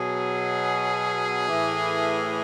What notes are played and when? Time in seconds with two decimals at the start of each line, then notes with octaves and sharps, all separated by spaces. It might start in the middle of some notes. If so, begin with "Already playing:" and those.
Already playing: B2 F#3 G#4
1.48 A2 E3